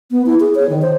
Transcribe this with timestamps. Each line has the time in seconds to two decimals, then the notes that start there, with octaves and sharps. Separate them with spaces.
0.11 B3
0.26 E4
0.40 G#4
0.55 C#5
0.69 D#3
0.82 C5